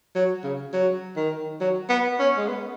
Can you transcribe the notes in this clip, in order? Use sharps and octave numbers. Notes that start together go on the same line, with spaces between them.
F#3
C#3
F#3
D#3
F#3
B3
C#4
G#3
B3